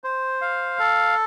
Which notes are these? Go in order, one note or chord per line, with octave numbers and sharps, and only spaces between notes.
C5
F5
A4